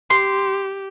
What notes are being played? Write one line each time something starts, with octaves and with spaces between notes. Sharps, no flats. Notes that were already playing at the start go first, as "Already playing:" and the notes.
G4 C6